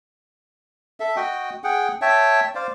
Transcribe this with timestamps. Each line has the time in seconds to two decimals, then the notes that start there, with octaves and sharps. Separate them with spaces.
1.00 A4 E5
1.16 F#4 D#5 G5
1.64 G#4 F#5 G5
2.02 C#5 E5 G5 A5
2.55 C5 D5 F5